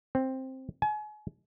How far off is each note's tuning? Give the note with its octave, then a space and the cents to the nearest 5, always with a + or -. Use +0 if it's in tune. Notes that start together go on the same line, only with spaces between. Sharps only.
C4 +5
G#5 +35